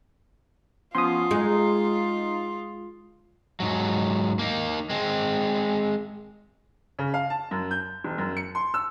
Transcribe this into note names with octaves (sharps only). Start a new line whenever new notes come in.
F3 B3 C#4 F4 C6 D#6
G#3 D#4
G#2 F#3
A#3 D#4
G#3 C4
C#3
F5
A5
F#2
G6
E1
F#2
C#7
C6
E6